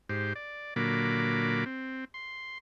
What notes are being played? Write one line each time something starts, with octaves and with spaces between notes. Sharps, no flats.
G#2 G4 C5
D5
A#2 D3 F#3 A#3 B5 D6
C4
C6